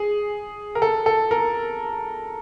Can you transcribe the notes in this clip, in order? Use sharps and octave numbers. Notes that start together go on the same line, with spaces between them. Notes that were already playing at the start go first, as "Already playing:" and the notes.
Already playing: G#4
A#4
A4
A4
A#4